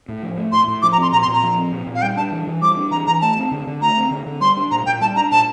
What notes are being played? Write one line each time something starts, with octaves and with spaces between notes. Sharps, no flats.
A2
F3
A3
A2 C6
A2
F3 D6
A#5
C4 C6
A#2 A#5
C6
A#2 A#5
F3
C4
A#2
A#2
F5
G3 G5
D4 A5
E3
E3
G3 D6
D4
E3 A#5
E3 A#5
A3 A5
C4
D3
D3
A3 A#5
C4
D3
D3
G3 C6
D4
A#2 A#5
A#2 G5
G3 A5
D4 A#5
A#2 A5